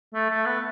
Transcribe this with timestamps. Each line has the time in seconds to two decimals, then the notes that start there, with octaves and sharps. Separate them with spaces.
0.14 A3
0.30 A3
0.46 B3